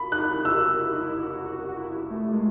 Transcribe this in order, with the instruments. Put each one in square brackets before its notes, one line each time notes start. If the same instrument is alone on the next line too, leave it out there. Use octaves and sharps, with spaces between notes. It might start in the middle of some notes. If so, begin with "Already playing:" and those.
Already playing: [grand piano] B5
[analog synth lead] D#4 [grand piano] F#6
[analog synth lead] E4
[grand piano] E6
[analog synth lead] F#4
E4
D#4
E4
F#4
F#4
F#4
E4
A3
G#3